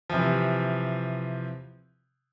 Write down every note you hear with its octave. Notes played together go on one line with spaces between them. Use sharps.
C3 E3 F3